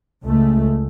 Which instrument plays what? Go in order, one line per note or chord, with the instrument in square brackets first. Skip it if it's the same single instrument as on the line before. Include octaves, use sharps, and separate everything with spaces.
[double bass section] C#2 A3